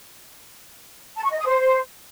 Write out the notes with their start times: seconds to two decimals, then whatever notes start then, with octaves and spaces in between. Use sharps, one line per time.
1.16 A5
1.24 C#6
1.31 D#5
1.38 D#6
1.46 C5